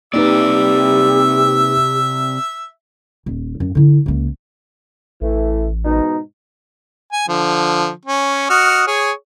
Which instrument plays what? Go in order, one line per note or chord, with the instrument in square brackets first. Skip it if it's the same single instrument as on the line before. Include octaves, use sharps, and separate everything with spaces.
[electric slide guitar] C3 D5 [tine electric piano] A#3 D#4 B4 [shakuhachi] G4 [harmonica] E5
[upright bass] D#1
F#2
D3 E4
C#2 A#3
[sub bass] A1 [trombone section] E3 A3
[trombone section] G#2 B2 D#4
[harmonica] G#5
D3 F3
C#4
F#4 D#5 F6
G#4 C#5